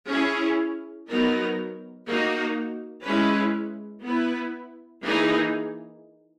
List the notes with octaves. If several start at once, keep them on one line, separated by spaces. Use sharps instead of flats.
C#4 E4 G#4
F#3 B3 D#4 A#4
A#3 D#4 F#4
G#3 C#4 E4 B4
B3 E4 B4
E3 A#3 D#4 G#4